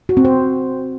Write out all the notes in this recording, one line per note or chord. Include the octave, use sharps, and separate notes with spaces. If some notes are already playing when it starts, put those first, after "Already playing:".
F#4
C4
C5